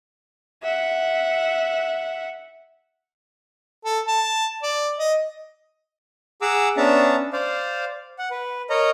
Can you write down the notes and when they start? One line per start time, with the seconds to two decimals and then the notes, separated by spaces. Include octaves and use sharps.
0.62 E5 F#5
3.85 A4
4.08 A5
4.63 D5
4.99 D#5
6.42 G#4 F#5 A#5 D6 E6
6.77 B3 C#4 D4 E5 A5 A#5
7.33 C5 D5 F5
8.19 F#5
8.31 B4
8.70 A#4 C#5 D#5 A#5